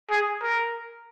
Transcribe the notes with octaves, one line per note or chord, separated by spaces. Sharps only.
G#4
A#4